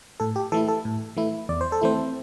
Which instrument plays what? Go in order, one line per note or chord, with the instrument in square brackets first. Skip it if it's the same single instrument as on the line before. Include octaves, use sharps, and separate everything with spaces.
[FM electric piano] A2 A4
G4
E3 A3 E4 A4
A4
A2
E3 A3 E4
E2 D5
C5
A4
E3 A3 C4 E4 C5